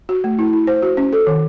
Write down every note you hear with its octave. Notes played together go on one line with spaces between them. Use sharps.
F#4
A3
E4
E4
C5
F#4
C#4
A4
D#3